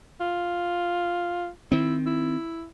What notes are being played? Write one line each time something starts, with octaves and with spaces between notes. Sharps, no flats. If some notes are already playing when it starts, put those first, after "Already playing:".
F4
D#3 C4 E4
E4